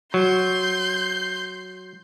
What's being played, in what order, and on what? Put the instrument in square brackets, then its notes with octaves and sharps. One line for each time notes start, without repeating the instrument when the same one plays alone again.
[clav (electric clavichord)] F#3 [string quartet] C6 G6